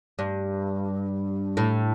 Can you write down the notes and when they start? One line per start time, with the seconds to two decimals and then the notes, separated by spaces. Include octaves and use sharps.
0.19 G2
1.57 A2